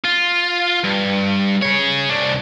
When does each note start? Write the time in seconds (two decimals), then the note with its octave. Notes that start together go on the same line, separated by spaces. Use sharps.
0.05 F4
0.84 G2
1.62 G#4 C#5
2.09 C2 D4